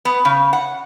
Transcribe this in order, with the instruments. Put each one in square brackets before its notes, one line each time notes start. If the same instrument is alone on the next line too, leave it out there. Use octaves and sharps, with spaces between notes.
[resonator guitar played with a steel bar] B3
C#3
F#5